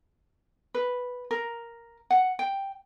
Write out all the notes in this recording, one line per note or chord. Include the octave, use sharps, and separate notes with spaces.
B4
A#4
F#5
G5